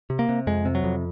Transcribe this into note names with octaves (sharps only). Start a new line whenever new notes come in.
C3
A#3
C3
F2 G#3
C3
F#3
F2